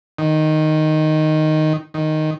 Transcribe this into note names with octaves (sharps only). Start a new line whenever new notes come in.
D#3
D#3